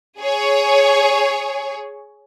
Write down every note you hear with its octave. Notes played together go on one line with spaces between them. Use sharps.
G#4 C#5